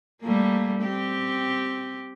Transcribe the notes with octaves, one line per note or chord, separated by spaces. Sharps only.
G3 A3 A#3
C4 G4